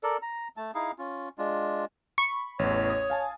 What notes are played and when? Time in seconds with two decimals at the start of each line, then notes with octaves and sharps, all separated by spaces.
0.03 A4 A#4 D5
0.22 A#5
0.57 A3 A5
0.75 D#4 E4 G#4 F5
0.99 C#4 F4
1.38 G#3 D4 F4
2.18 B5 C#6
2.59 A1 E2 C#5
2.90 D#6
3.10 F5 G#5 A5